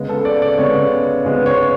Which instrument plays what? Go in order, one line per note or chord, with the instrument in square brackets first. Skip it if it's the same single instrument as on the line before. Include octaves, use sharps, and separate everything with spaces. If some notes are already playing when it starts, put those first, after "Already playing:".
Already playing: [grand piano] C#3 G#3 B3
A4
D5
D5
C#3 G#3 B3 C#5
C#3 G#3 B3
C#5